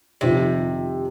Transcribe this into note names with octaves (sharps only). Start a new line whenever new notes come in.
F2 C3 D#3 C4 F4